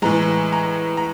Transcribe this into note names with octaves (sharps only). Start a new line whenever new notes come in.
A2 E3 G#3 A#5
A#5
A#5